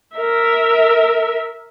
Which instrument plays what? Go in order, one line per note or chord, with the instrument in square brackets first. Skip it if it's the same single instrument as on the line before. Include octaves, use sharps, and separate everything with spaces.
[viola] A#4 E5